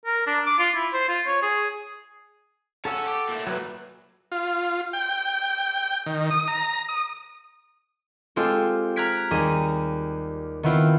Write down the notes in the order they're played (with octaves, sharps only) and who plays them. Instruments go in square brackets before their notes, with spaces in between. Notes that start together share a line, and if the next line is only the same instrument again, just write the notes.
[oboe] A#4
D4
D6
F4
E4
C5
F4
C#5
G#4
[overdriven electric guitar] C#4 G#5 [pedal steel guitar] A4 F#5 E6
[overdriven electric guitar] G4
A#2 A3
[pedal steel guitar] F#3 B4
[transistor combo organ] F4
G5
D#3
D#6
A#5
D#6
[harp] G#3 C4 F4 G4 A4
A#5 F6 F#6 G#6 B6 D7
D#2 G3 G#4 A#5 D#7
D#3 B3 C4 E4 F4